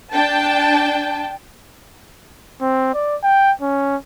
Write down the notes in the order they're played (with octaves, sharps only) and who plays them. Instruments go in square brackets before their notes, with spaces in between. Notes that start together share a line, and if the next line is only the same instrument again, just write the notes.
[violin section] D4 G5 A5
[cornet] C4
D5
G5
C#4